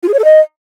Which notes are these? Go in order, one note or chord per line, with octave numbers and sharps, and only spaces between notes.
F4
G#4
C#5
A4
D#5